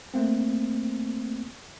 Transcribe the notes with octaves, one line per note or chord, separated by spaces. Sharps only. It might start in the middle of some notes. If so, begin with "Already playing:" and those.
A3 A#3 C4